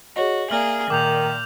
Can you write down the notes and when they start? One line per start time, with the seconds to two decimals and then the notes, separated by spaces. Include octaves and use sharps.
0.16 F#4 G#4 C#5 D#5
0.50 A#3 G#4 D5 E5 F6 F#7
0.90 A#2 D#3 D6 G6 F7